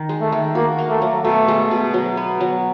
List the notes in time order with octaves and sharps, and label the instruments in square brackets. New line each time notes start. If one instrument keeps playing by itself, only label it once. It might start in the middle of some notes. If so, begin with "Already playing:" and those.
Already playing: [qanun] D#3
G#3
[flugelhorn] A3
[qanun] D#3
[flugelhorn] A#3 [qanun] F#4
[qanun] A#3
[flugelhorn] A3
[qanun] F#3
[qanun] B2 [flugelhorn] A3
[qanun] G#3
B2
F#3
B3
F#3